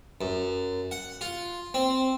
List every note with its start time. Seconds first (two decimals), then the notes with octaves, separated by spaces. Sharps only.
0.21 F#2
0.91 F#5
1.21 F4
1.74 C4